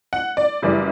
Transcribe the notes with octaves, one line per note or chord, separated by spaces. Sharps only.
F#5
D5
F#2 C#3 E3 G3